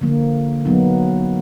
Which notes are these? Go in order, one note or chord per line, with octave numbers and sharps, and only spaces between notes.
D3 F3 A#3
F#3 B3 D#4